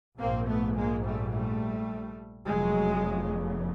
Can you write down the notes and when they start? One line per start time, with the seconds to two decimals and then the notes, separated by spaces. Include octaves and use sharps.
0.19 A#1 G#2 A#3 C4
0.48 A3 B3
0.77 G#3 A#3
1.05 G3 A3
1.33 G3 A3
2.49 F1 E2 C#3 F#3 G#3